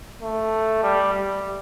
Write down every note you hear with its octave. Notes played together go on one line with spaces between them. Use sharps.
A3
G3
G3